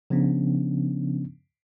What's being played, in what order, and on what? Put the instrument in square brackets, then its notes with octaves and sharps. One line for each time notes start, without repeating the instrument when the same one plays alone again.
[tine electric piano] C#3 F3 B3 C#4 D4